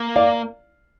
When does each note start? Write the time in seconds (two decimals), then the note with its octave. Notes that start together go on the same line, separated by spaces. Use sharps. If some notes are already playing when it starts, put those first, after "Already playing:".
Already playing: A#3
0.16 D5 F5